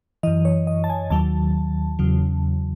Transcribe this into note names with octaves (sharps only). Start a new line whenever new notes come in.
F#2 E3 D#5
C#5
D#5
A5
G#5
D#2 D#3 F#3 A5
E2 C#3 F#3